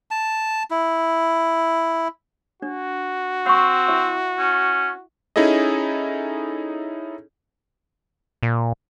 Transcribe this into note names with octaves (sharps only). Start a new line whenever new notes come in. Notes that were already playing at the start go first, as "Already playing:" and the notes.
A5
E4
D4 F#4
C4 F#5 C#6
E4 E5
C#4
C#4 D#4 E4 G#4 A4 D#5
A#2